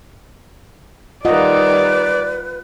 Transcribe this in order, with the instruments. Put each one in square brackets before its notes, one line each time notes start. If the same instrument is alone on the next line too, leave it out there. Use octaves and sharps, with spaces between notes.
[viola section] D#3 G3 [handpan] F4 D#5 F#5 [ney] B4 [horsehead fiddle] D5